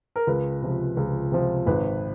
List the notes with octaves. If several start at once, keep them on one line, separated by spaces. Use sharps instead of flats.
A#4
C#2 B4
C3 F3
C#2
C3 F3
G#1 B4